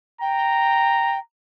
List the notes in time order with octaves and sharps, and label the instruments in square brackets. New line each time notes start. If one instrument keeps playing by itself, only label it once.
[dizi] G5 [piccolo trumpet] A#5